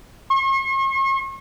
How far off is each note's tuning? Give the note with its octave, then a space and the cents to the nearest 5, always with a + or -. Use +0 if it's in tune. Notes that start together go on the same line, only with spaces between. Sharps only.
C#6 -45